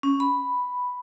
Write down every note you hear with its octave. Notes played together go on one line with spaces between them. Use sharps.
C#4
B5